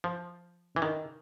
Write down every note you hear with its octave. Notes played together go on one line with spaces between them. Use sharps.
F3
E3
D#3